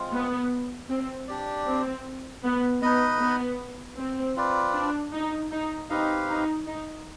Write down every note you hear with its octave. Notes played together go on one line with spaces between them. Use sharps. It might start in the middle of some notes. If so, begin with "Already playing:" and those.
Already playing: G#3 C4 F4
B3
C4
D4 G4 D5
C4
B3
B3 D#4 B4 D#5
B3
C4
C4 F4 B4 D5
D4
D#4
D#4
C4 D#4 G4 B4 F5
D#4
D#4